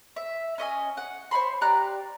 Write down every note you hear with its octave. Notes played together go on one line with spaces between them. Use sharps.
E5
C#4 D#5 E5 G#5
F#5
C5 C#5 B5 C6
G4 D5 A#5 F#6